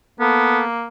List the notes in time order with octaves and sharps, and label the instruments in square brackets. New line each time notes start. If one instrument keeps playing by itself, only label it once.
[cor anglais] A#3 [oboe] B3 [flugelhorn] A4